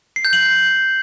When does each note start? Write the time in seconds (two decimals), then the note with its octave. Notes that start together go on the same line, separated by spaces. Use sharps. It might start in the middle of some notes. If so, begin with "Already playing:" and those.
0.16 C7
0.25 G6
0.33 F#7